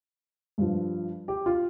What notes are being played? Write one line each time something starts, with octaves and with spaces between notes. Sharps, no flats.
G2 F3
G4
F4